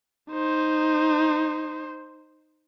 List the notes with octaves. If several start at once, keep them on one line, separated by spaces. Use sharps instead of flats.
D#4 C5